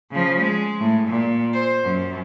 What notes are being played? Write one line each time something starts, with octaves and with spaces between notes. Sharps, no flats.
C#3 F3
G#3
A2
A#2
C5
F#2